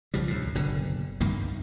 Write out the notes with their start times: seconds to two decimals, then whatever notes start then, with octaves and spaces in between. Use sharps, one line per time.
0.14 C2 C#3 F3 G3
0.28 D2 A2
0.55 F#1 B2 D3
1.21 C2 G2 D#3 A#3